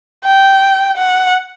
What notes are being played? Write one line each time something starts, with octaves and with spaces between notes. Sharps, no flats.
G5
F#5